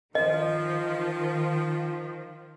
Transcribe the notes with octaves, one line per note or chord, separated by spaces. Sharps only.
D#3 F3 D#5